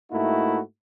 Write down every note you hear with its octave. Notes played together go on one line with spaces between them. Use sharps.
G#2 A3 A#3 D#4 E4 F#4